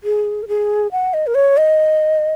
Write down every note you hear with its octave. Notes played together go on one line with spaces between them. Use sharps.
G#4
A#4
G#4
F#5
D#5
A#4
C#5
D#5